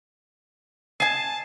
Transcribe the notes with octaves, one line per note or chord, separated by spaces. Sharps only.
D#5 G#5 A5 C7